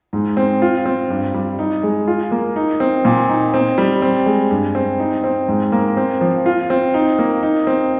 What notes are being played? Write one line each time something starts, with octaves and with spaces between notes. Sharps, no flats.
G#2
C4
F4
C4
G2
G3
D#4
G#3
F4
A#3
D#4
C4
A#2
D#4
C4
G3
C4
G#3
G2
C4
D#4
C4
G#2
A#3
C4
F3
F4
C4
D#4
A#3
D#4
C4